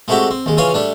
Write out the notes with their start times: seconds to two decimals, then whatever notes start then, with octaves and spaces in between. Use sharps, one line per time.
0.08 G#3 A3 C4 E4 F#4 G4
0.31 C4
0.46 D#2 G#3
0.57 C#3 E3 F4 C#5 F5 G#5
0.74 G3 A3 D4